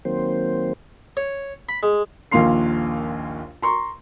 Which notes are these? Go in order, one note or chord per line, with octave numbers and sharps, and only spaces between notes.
D#3 F#3 A#3 C4 C5
C#5
B5
G#3
A#1 D#2 A#2 F5 C6 C7
A#5 C6 C#6